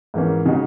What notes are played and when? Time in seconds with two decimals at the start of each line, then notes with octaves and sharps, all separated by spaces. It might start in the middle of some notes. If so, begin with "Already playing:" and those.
0.14 G#2 E3 A#3 C#4
0.46 C#3 G#3 D#4 F#4